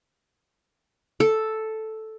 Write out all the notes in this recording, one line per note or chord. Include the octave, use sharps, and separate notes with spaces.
A4